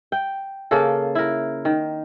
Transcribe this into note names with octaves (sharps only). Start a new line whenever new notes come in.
G5
C#3 A#3 A4
E4 A#4
D#3